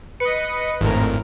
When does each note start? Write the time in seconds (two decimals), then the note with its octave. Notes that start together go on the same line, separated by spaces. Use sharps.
0.20 B4 D#5 C#7
0.81 G#1 F2 A2 A#4